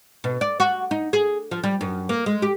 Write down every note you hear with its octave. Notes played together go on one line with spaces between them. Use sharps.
B2
D5
F#4
D#4
G#4
F3
G3
F#2
A#3
G#3
G4